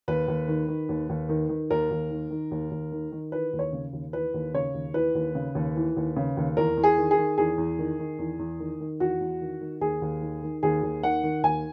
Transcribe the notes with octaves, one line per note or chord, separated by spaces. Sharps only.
D#2 B4
D#2
D#3
D#3
D#2
D#2
D#3
D#3
D#2 A#4
D#2
D#3
D#3
D#2
D#2
D#3
D#3
E3 B4
D#2
C#5
C#3
D#2
E3 B4
D#2
C#3 C#5
D#2
E3 B4
D#2
C#3
D#2
E3
D#2
C#3
D#2
E2 A#4
E2
G#4
D#3
G#4
D#3
E2 G#4
E2
D#3
D#3
E2
E2
D#3
D#3
E2 F#4
E2
D#3
D#3
D#2 G#4
D#2
D#3
D#3
D#2 G#4
D#2
D#3 F#5
D#3
D#2 G#5